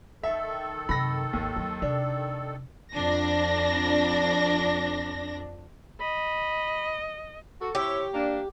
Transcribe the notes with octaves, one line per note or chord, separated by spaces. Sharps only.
D#3 A4 E5
F#2 C3 B5 A#6
G#1 D#2
F#3
C3 D4
F2 D4 A#6
D#5 B5
F#4 A4
C3 E4 G4 C#5
A#3 D4